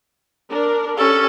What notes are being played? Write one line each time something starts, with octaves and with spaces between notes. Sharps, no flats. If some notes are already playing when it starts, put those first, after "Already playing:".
D4 A#4
C#4 G4 A4